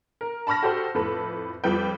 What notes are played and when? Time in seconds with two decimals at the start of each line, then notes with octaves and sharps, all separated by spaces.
0.21 A#4
0.47 A5 B5 C#6 F6 A#6
0.62 F#4 G4 A4 C5
0.94 F2 A2 A4 B4
1.64 F2 F3 G3 B4 G5